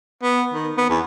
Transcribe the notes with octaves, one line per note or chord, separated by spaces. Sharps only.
B3
D#3
B3
E2